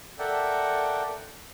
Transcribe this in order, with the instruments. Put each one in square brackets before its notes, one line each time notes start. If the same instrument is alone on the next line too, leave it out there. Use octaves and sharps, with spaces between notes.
[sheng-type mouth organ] A4 A#4 D5 E5 F#5 G5